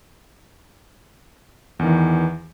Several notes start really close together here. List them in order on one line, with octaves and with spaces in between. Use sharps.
E2 D#3 E3